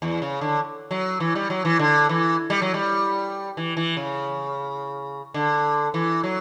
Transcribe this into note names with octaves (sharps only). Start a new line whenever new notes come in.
E2
C#3
D3
F#3
E3
G3
F#3
E3
D3
E3
G3
F#3
G3
E3
E3
C#3
D3
E3
F#3